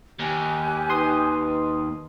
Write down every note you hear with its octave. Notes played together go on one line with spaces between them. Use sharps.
D#2 G4 G#5 F#6
D#4 B4 C6 D#6